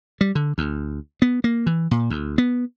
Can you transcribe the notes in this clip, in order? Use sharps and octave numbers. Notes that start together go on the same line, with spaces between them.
G3
D3
D2
B3
A#3
E3
A#2
D2
B3